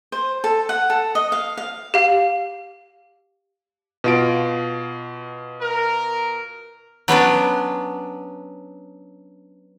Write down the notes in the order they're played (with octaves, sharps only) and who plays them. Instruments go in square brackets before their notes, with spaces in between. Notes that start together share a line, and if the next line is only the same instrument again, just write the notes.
[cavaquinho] C5
A4
F#5
A4
D#5
F5
F5
[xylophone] G4 F5
[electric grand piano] B2 F4 D7
[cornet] A#4
[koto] F#3 B3 C#4 D4